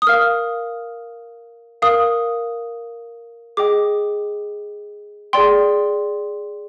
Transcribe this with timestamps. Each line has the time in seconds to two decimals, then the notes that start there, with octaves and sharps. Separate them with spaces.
0.02 D#6
0.07 A#4 F5 F6
1.82 A#4 F5 D#6
3.57 G#4 D#5 G5 D6
5.33 G#4 D5 G5 C6